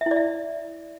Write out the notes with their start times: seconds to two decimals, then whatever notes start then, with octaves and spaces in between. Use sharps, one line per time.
0.01 E5
0.06 E4
0.11 D5
0.16 E5